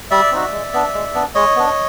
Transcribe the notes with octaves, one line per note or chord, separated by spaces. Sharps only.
G3 D5 E5
C4 D#4 F#4
G#3
B3 D4
G#3
B3 D4
G#3 C#5 D#5
B3 D4